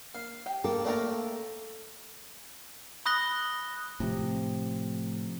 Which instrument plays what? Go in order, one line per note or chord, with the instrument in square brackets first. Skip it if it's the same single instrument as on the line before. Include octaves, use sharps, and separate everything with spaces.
[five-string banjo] A#3 [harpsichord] F5
[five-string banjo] G4 G5
[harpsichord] A#3 [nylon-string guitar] A4
[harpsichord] A3 A#3 A#4 [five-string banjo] D5 G5 A#5
[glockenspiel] B5 D#6 F#6 A#6 G7
[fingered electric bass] A2 F3 [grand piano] C3